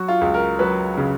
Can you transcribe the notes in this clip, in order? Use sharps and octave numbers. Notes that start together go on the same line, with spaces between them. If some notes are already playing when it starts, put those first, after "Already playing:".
Already playing: F#3 F#4
F4
C#2
A#4
F#3 B4
C#3